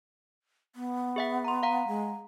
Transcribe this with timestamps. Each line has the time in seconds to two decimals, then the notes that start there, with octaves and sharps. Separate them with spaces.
0.76 B3
1.16 G#4 E5 F#5
1.44 A#5 C6
1.63 F5 F#5 A#5
1.88 G#3